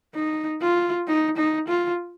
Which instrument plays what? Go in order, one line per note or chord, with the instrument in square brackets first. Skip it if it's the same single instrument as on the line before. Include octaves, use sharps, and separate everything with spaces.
[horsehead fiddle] D#4
F4
D#4
D#4
F4